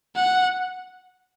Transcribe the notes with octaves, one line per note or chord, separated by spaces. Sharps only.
F#5